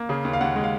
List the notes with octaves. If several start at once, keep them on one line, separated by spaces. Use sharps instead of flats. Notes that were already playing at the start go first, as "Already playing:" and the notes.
Already playing: A#3
C#3 G#4
D#2
F5
D#2 F#5
G#3
F5